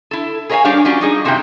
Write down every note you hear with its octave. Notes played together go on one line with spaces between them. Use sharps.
E4 A4
G#4 A#4 C#5 E5 F5 G#5
G3 D4 G4 G#4 C#5 F5
F#3 C#4 F4 D5
G3 D#4 G#4
F#2 C3 A#3 E4 A#4 G5